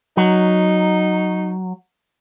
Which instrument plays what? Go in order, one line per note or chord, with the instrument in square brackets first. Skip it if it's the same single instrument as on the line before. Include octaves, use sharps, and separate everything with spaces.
[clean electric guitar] F#3 [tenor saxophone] D#4